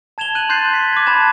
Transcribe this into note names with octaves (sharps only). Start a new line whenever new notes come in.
A5 G#6 E7 F7 G7
F#6 D#7 F#7
C6 F#6 G6 A6 C7
B6 C7
D6 G#6
A5 B5 F#6 G#6 E7